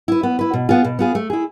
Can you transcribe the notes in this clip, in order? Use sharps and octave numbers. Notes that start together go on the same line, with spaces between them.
E4 B4
B3
E4 B4
B2
B3 F4 G#4
B2
B3 F4 G#4
A3
E4 G#4